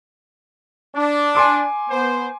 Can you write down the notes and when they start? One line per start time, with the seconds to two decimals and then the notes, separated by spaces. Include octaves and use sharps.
0.95 D4
1.35 G#5 C6 D6
1.90 B3 C5